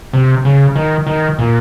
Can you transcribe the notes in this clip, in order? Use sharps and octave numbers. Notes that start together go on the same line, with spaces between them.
C3
C#3
D#3
D#3
A#2